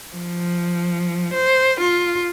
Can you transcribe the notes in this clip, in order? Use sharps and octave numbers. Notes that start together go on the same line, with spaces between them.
F3
C5
F4